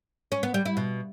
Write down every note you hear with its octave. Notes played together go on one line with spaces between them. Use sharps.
C#4
B3
G3
E4
B2